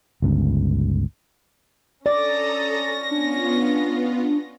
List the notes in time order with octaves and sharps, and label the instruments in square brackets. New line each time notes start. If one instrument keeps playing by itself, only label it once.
[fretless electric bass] G1 C#2
[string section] C#4 A#6 [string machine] A4 A#5 D#6 [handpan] D5 [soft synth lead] A6
[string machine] B3 F4 [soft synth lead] D4